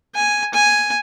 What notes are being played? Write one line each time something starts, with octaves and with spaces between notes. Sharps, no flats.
G#5
G#5